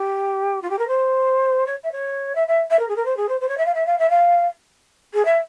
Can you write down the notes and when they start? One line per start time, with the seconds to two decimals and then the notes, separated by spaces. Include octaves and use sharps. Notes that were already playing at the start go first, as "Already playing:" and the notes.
Already playing: G4
0.62 F4
0.70 G4
0.78 A#4
0.88 C5
1.66 C#5
1.83 E5
1.92 C#5
2.35 E5
2.47 E5
2.70 E5
2.79 A#4
2.88 G#4
2.96 A#4
3.05 C5
3.16 G#4
3.28 C5
3.40 C5
3.48 C#5
3.57 E5
3.65 F5
3.74 E5
3.86 F5
3.98 E5
4.10 F5
5.14 G#4
5.25 E5